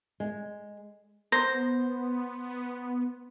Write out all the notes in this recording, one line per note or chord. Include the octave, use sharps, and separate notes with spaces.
G#3
B3 C5 A#6